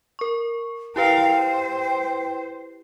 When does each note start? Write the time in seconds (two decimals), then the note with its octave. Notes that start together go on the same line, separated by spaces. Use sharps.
0.19 A#4 C#6
0.96 E4 G4 A#4 B4 F5 G5
1.34 C5